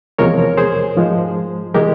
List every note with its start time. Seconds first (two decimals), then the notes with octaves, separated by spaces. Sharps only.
0.18 E2 C3 F3 G#3 A#4 C#5
0.57 G#4 C5
0.97 G#2 F3 G#3
1.75 C3 E3 G#3 G4 A#4